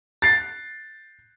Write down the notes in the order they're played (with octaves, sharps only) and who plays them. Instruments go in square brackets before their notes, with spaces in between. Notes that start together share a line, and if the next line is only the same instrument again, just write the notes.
[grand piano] A6 C7